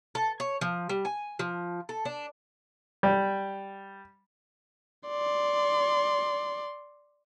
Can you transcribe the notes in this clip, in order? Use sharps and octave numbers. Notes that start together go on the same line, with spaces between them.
A4
C#5
F3
G3
G#5
F3
A4
D4
G3
D5 C6